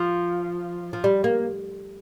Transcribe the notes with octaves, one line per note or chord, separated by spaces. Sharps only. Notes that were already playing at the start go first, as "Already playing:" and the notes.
Already playing: F3
F3
G3
A#3